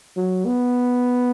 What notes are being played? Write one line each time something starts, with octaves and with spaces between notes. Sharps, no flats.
F#3
B3